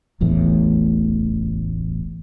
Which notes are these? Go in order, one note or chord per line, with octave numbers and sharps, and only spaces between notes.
D1 A1 E2 A2